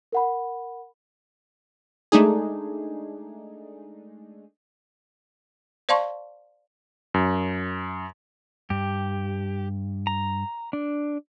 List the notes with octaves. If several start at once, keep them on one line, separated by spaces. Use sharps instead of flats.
A#4 F#5 B5
G#3 A3 D4 D#4 G#4
C5 D5 F5 A5 C6 C#6
F#2
G2 G4
A#5
D4